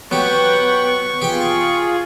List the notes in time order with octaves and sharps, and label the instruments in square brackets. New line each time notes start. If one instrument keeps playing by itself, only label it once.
[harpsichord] F#3 G4 [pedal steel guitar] B3 [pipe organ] F#5 G5 [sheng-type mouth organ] C#6
[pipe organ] F4 G#4 [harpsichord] G4 G5